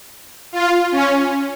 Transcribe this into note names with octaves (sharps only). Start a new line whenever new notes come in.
F4
C#4